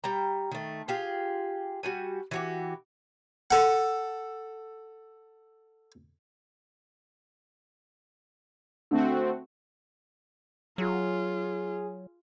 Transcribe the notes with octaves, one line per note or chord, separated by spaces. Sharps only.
G3 G5 A#5
D#3 A3
F4 G4 G#4 F5
G3 F#4 G#5
E3 F#4 G4
A4 F#5
D3 A3 C4 F#4
F#3 F4 G#4